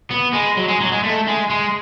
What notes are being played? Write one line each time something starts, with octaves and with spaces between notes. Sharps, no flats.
B3
G#3
F#3
G#3
F#3
G#3
A3
G#3
G#3